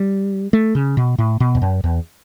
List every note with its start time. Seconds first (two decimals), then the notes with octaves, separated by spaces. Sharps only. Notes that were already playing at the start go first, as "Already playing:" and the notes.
Already playing: G3
0.53 A3
0.75 C#3
0.97 B2
1.18 A2
1.40 B2
1.55 E2
1.62 F#2
1.84 E2